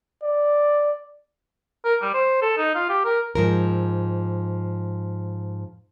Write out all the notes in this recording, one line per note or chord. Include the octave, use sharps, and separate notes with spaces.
D5
A#4
G3
C5
A4
D#4
F4
G4
A#4
G#2 F3 A#4